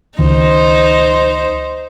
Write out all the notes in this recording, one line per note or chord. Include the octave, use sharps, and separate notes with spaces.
C#2 D#3 D#4 C5